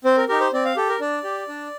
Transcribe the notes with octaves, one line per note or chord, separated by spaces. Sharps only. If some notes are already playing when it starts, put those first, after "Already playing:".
C4 C5
A#4
D#4 G4 A#4
C5
C4 D5
F5
G4 A4
A#4
D4 D5
G4
D4